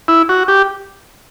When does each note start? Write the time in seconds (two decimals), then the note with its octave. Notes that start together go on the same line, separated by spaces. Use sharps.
0.08 E4
0.29 F#4
0.48 G4